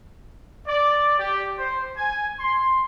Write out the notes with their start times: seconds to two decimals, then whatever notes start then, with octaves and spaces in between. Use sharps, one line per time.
0.67 D5
1.19 G4
1.57 C5
1.96 G#5
2.40 C6